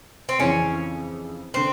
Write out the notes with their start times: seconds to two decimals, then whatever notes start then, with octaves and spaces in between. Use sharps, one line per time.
0.29 C4
0.39 F2 C#3 E3 C#4
1.54 D3 C4